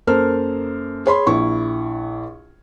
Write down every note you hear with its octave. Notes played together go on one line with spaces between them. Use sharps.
F#2 A#3 A4 A#4 C5 F6
G#4 C#5 B5 C6
A#1 E4 C#6